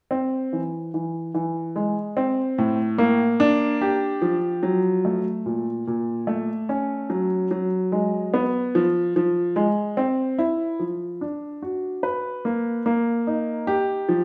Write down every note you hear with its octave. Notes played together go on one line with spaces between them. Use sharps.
C4
E3
E3
E3
G#3
C4
A2
A#3
D4
G4
F3
F#3
A3
A#2
A#2
A3
C#4
F#3
F#3
G#3
B3
F3
F3
G#3
C4
E4
F3
D4
F#4
B4
A#3
A#3
D#4
G4
F3